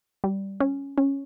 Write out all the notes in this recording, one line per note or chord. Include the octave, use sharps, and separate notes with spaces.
G3
C#4
C#4